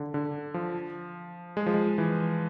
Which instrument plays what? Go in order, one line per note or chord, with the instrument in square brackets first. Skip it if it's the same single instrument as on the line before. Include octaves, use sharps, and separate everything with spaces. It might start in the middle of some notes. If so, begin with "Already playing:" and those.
Already playing: [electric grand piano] D3
D3
F3
G#3
F3
G#3
E3